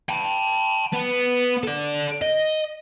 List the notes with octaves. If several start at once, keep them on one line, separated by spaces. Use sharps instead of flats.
G5 A5
B3
A4 D5
D#5